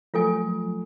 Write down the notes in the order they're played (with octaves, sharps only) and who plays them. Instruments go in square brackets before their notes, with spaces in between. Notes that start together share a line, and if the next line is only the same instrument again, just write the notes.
[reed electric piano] F3 F#3 A3 [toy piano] F4 A4 G#5